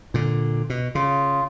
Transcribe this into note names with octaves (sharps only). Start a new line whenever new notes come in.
A#2 D3
B2
C#3 F4